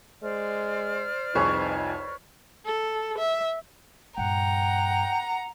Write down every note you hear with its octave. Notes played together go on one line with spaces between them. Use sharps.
G#3 C5 D5 F6
C2 F2 D#4 G#4 B4 C#5
A4
E5
G2 A#2 F#5 G5 A#5